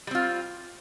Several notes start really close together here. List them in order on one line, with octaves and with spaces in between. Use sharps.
G3 C4 F4